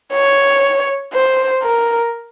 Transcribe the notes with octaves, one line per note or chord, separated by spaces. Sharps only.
C#5
C5
A#4